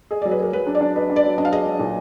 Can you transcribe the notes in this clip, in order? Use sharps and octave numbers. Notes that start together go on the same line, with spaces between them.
G#4 D#5
D5
F#3
B4
G#4 A#4
F#3 B4
D4
D5
D4
B4 D#5
D4
D5
F#3
D4 D#5
F5
G#4 D#5
F#3
A#2